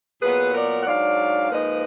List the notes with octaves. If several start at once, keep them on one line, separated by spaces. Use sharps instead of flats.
A#2 F#3 B3 G#4 B4
A#4 D5
F#5
G#2 F#3 D4 D5 F5
G#2 F3 A#3 B4 D#5